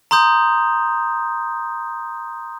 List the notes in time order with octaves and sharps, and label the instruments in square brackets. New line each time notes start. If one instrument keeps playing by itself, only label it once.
[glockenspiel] A#5 C6 D#6 G6